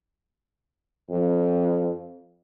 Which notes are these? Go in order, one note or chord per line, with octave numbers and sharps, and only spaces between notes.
F2